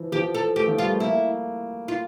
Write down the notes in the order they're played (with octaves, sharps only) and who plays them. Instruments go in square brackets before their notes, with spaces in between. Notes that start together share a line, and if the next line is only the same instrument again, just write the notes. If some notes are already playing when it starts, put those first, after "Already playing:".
Already playing: [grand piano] E3 F3
[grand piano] F3 [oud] G4
[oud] A4
[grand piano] A3 [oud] G4
[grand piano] F3
[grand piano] G3 [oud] F4
[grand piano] A3
[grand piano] A#3 [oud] E4
[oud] F4